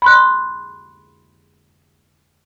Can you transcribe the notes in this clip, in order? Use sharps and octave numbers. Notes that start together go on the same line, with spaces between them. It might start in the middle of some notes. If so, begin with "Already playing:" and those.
B5 C6 F#6